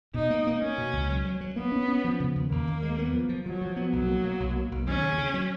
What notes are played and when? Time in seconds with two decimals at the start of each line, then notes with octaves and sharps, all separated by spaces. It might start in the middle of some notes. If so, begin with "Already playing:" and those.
0.14 B2 D#4
0.30 A#3
0.47 A#3
0.61 A#3 C#4
0.78 B2
0.93 C#2
1.10 F#3
1.25 F#3
1.41 F#3
1.56 A#3 B3
1.72 C#4
1.88 C#4
2.04 F3
2.20 C#3
2.36 D#2
2.50 D#2 A#3
2.67 D#2
2.83 G#3
2.99 B3
3.13 F3
3.29 F3
3.46 F3 F#3
3.61 F3
3.76 B3
3.93 B1 F#3
4.08 A#3
4.24 A#3
4.40 B1
4.56 A#3
4.72 B1
4.87 D#2 C#4
5.03 C#3
5.18 C#3
5.34 F#3